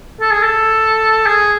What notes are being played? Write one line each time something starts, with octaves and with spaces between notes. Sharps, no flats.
A4
G#4
A4
G#4